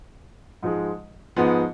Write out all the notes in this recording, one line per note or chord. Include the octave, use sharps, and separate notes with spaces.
G#2 F3 G#3
G#2 F3 G#3 B3